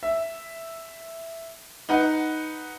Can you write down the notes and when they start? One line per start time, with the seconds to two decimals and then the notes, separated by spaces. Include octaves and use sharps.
0.03 E5
1.89 D#4 B4 F#5